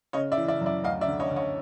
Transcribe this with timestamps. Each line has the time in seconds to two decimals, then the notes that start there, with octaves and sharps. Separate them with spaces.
0.13 C#3 C#5 D#5
0.32 D5 E5
0.37 E3
0.48 D5 E5
0.61 F#2
0.66 D5 E5
0.84 D2 D#5 F5
1.01 D5 E5
1.07 D3
1.20 C#5 D#5
1.31 D3
1.36 C#5 D#5